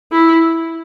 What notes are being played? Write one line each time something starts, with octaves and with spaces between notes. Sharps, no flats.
E4